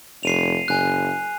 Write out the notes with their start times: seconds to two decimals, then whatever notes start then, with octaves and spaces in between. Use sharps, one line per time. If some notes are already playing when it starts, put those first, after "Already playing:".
0.23 F1 C7 D#7 F7
0.68 F#1 G#5 F#6